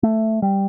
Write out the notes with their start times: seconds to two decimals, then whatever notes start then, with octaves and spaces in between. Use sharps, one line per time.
0.03 A3
0.42 G3